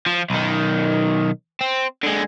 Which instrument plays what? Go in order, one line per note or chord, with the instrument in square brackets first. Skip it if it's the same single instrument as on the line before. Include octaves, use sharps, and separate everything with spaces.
[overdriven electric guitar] F3
B1 D#3
C4
D3 G#3